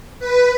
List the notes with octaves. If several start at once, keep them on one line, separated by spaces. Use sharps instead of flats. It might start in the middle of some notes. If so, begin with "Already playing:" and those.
B4